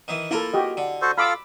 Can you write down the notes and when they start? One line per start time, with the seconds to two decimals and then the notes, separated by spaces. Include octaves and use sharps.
0.08 D#3 E3
0.31 A#3 E4 F4 A4 A#4
0.53 F#4 G4 D#5
0.77 D3
1.02 F#4 A4 C5
1.18 F4 A4 F5 B5 D6 E6